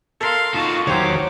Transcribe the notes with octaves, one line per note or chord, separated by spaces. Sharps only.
A4 A#4 F5 C6
D#4 F4 F#4 A5
D#3 F#3 G4 C5 C#5 D6